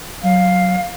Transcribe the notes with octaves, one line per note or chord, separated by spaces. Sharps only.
F#3 F5